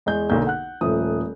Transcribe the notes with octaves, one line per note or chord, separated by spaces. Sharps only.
E2 G#3 D#5 G6
B1 D3 A#3 G6
F#5 F#6
D#1 F3 A3 D#6